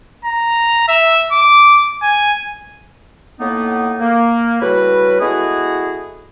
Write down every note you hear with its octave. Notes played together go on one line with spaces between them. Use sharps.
A#5
E5
D6
G#5
A2 A#3 B3 D#4
A#3
A2 C#3 G3 F#4 B4
G#3 A3 B3 E4 F#4 G#4